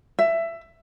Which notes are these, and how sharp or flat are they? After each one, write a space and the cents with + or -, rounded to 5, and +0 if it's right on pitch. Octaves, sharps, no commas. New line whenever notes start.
E5 +15